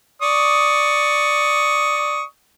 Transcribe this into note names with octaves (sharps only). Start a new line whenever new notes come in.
D5 C#6 D#6